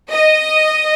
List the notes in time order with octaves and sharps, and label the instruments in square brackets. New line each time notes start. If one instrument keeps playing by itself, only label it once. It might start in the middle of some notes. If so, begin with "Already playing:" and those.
[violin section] D#5